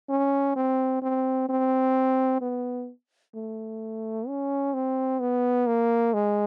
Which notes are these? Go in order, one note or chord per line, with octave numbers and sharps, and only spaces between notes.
C#4
C4
C4
C4
B3
A3
C#4
C4
B3
A#3
G#3